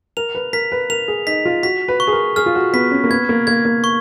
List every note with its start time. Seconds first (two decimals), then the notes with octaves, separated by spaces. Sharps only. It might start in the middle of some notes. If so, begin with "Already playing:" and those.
0.17 A#4 F7
0.35 B4
0.53 A#4 B6
0.72 B4
0.90 A#4 F7
1.08 G#4
1.27 D#4 B6
1.45 F4
1.63 F#4 B6
1.88 B4
2.00 C#6
2.07 G#4
2.12 A#4
2.36 G#4 F6
2.46 F4
2.55 F#4
2.73 B3 B6
2.92 C#4
3.04 A#3
3.10 B3 G#6
3.29 A#3
3.47 A#3 G#6
3.65 A#3
3.84 C#6